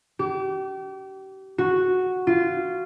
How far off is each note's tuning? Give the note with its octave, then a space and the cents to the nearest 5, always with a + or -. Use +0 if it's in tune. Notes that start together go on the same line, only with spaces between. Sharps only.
G4 -35
F#4 -5
F4 -15